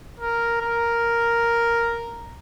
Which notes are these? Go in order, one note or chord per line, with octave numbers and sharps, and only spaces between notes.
A#4
A#4